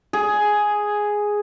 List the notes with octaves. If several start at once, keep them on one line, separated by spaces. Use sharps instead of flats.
G#4